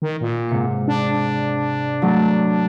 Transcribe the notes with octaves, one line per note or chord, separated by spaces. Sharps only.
D#3
A#2
G#2 C3 C#7
D4
F#3 A3